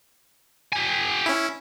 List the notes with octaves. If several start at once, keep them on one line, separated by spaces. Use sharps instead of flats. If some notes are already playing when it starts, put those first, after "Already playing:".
G4 G#5
C#4 E4